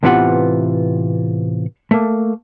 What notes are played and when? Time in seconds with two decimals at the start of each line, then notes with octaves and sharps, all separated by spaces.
0.03 A2 C3 E3 B3 F4 F#5
1.91 A3 A#3